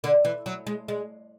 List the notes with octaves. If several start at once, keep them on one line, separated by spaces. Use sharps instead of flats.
D3
E3
F#3
G#3
G#3